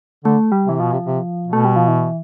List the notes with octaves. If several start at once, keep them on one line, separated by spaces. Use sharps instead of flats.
D3 A3
G3
C3 E3
B2 F3
C3
C3
B2
A3
G3
F3
E3